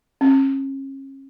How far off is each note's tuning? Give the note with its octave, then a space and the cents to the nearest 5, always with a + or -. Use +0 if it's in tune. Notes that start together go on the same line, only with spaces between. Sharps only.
C#4 -35